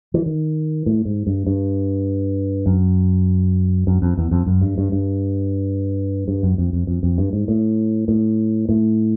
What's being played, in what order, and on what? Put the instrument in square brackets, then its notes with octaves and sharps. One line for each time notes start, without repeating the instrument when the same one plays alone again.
[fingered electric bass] E3
D#3
A2
G#2
G2
G2
F#2
F#2
F2
E2
F2
F#2
G2
G2
G2
G2
F#2
F2
F2
F2
F2
G2
G#2
A2
A2
A2